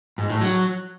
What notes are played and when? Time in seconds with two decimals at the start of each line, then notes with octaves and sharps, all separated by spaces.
0.18 G#2
0.30 A2
0.41 F#3